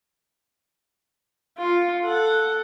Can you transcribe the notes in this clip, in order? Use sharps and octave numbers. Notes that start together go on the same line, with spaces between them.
F4
A4 F#5